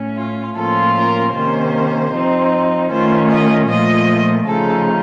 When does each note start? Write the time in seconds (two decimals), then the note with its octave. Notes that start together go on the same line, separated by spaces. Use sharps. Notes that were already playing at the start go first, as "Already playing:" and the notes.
Already playing: A2 A3 C#4
0.18 F4
0.57 A2 F3 A#3 C#4 F4 A4
0.96 A#4
1.35 C3 D#3 A#3 C#4 C5
2.13 F3 C4 D#4
2.91 D#3 A3 C#4 F4 C5
3.30 D#5
3.69 A#2 F3 A3 D#5
4.47 C#3 F3 A3 D#4 A4